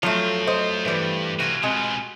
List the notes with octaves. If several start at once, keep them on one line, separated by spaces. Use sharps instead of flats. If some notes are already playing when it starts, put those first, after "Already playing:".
F3 F#3 A3 C4 F4
C5 D#5
G2 E3 G3
C3 F4 F#4 G#5
B2 G#3 C4 F4